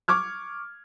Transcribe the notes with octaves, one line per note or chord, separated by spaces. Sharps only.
C#6 D6 F6 G#6